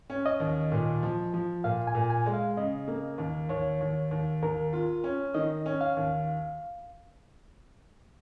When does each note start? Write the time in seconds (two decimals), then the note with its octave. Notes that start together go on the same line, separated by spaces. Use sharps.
0.10 C#4
0.26 D#5
0.40 D#2
0.72 A#2
1.03 F3
1.33 F3
1.64 A#2 F5
1.87 G#5
1.95 A#2
2.10 G#5
2.26 G#3
2.33 F5
2.57 C#3 D#5
2.88 A#3
3.18 D#2
3.49 D#2 C#5
3.81 D#2
4.11 D#2
4.43 D#2 A#4
4.73 F4
5.04 C#4
5.34 D#3 D#5
5.66 C#4
5.81 F5
5.97 D#2